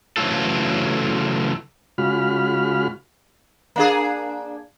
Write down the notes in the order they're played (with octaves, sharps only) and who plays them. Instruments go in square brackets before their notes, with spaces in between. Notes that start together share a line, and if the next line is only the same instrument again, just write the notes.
[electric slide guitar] C#3 E3 F#3 A3 F4 A4
[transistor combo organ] C#3 G#3 F4 F#4 B5 F6
[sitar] A#3 D4 G#4